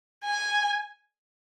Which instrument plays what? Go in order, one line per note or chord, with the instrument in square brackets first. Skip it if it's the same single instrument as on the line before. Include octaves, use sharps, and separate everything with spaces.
[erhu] G#5